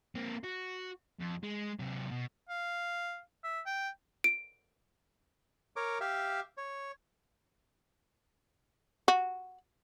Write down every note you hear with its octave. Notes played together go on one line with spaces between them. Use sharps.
A#3 C4
F#4
F2
G#3
C3 F#3
B2
F5
E5
G5
D7
A#4 C#5 D6
G4 E5 F5
C#5
F#4